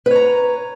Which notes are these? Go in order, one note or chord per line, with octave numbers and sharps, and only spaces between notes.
B4 C#5 A#5